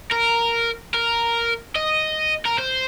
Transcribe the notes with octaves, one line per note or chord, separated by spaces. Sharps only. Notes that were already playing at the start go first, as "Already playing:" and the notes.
A#4
A#4
D#5
A#4
C5